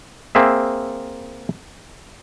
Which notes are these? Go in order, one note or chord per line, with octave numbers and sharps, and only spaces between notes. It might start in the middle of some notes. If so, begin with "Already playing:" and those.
A#3 C4 G#4 E5